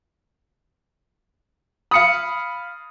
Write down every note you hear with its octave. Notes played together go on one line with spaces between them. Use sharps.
F5 B5 D#6 C#7